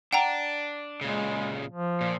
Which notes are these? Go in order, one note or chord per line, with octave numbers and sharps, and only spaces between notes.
D4 F#5 G5 A#5
A#2 C#3 G#3
F3
A#2